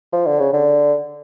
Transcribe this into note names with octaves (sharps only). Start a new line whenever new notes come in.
F3
D3
C#3
D3